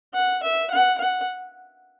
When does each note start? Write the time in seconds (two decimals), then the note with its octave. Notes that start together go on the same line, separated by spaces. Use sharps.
0.14 F#5
0.43 E5
0.71 F#5
0.98 F#5